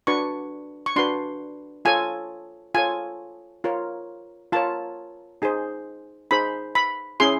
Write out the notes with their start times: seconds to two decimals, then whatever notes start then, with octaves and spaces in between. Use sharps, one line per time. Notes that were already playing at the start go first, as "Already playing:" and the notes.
0.07 D4 F#4 B4 C#6
0.86 C#6
0.96 D4 F#4 B4 C6
1.85 F4 A4 C#5 G#5
2.74 F4 A4 C#5 G#5
3.64 F4 A#4 C#5
4.52 F4 A#4 C#5 A5
5.42 D#4 G#4 C5
6.31 D#4 G#4 C5 B5
6.75 B5
7.20 C#4 E4 G#4 C6